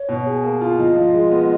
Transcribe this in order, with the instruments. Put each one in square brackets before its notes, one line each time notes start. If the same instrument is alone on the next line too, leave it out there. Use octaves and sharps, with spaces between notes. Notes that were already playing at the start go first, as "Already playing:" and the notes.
Already playing: [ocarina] C#5
[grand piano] B2
G#4
A#3
F4
[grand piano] F3 [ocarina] D#5
[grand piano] F3
G#3
B3